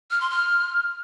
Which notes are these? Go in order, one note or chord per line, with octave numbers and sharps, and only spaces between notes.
F6
C6
F6